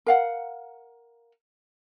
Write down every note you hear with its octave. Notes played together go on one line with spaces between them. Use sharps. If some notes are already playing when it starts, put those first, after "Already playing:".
A#4 F5 F#5